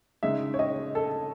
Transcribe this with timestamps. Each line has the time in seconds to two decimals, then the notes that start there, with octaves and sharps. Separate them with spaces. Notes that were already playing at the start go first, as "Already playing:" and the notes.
0.23 C#3 G#3 D#4 E5
0.54 C#5
0.59 D#5
0.95 A4